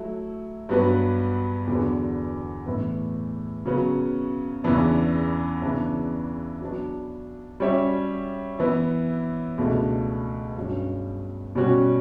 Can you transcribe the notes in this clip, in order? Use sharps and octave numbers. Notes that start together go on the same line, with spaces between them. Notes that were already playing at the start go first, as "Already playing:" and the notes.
Already playing: F#3 A3 E4
G2 F#3 B3 F#4 B4
E2 D3 F#3 B3
A2 E3 B3
C#3 F#3 B3
E2 C#3 E3 B3 D4
C#3 E3 B3 D4
F#3 B3 D4
G3 C#4 F#4 C#5 E5
E3 B3 E4
C#2 B2 A3 D4
G2 F#3 C#4
B2 G3 C#4 F#4